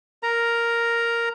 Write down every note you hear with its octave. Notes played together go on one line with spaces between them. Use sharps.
A#4 A#5